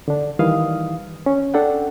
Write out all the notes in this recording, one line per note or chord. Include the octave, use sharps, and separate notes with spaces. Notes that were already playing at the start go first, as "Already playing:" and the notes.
D3 D4
D#3 E3 G3 E4 F5 D#6
C#4
D4 A4 F#5 G5